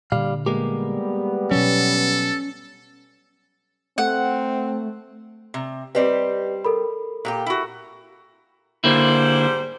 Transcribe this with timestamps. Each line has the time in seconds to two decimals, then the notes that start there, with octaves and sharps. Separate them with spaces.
0.12 A#2 D3 G3 F5
0.46 G3 G#3 A#3 B3 G4
1.51 B2 F#3 C#4 A4
3.98 A3 C4 F#5
5.54 C3
5.95 G3 C4 G4 B4 D5 D#5
6.65 A4 A#4 B5
7.25 A#2 G4 G5
7.46 E4 F#4
8.84 G#2 D3 G3 A#3 E4 C5